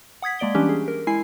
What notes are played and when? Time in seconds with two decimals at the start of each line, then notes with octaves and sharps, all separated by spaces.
0.22 F#5 D#6 G#6 B6
0.39 G#3 A#3 D5 D7 G7
0.55 E3 G3 C#4 D4 G4
0.69 G#4
0.88 A#4
1.07 G#3 E4 G#5 C7